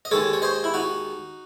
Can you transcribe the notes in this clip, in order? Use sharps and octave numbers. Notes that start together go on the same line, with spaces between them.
D#5
D#2 D#3 G#3 A4 C#5
C#5
C5 D#5
E4
D#4 F#4